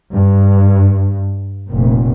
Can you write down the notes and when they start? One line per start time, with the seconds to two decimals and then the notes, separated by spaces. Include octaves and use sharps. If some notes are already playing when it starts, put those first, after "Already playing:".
0.13 G2
1.70 F1 A#2